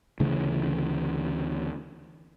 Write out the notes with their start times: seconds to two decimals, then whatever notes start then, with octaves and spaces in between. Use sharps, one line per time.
0.20 D2 C#3 E3 A3